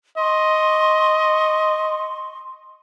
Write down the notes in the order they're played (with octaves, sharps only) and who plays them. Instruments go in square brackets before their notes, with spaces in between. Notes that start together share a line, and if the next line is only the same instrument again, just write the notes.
[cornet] D#5 [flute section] C6 C#6